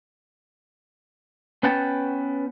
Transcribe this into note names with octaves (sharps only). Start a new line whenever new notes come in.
B3 C#4 B4 F#5 G5 A5